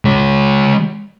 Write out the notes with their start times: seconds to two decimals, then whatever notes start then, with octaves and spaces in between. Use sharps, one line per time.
0.05 G#3 C#5